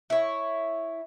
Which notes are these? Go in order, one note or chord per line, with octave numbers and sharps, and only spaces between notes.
E4 C#5